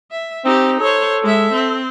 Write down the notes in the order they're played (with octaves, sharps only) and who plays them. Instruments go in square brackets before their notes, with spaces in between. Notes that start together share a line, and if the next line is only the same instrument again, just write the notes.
[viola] E5
[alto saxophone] C4 [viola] D#4 G4
[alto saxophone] A4 [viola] C5 C#5
[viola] G#3 E5
C4